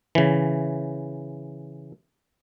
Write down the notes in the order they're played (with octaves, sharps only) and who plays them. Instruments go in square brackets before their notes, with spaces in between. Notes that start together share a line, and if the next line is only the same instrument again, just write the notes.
[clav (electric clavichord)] C#3 E3